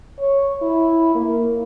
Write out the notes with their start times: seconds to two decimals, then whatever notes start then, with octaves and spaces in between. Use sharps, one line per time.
0.19 C#5
0.62 E4
1.15 A#3